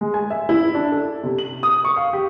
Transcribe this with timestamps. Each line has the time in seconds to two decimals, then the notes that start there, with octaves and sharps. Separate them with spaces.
0.01 G#3
0.14 G#5
0.30 E5
0.49 E4
0.75 D4
0.92 A4
1.23 C3
1.39 F#7
1.63 D#6
1.85 C#6
1.96 F5
2.13 G4